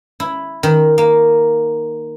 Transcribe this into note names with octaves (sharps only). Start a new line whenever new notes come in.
E4
D#3
A#3